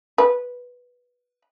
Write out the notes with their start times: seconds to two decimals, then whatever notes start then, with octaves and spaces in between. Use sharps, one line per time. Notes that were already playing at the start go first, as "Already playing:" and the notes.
0.18 B4